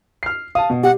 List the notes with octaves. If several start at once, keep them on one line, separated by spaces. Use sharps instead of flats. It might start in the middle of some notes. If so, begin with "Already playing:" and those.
F6 C7
F5 A5 D#6
B2
G4 F#5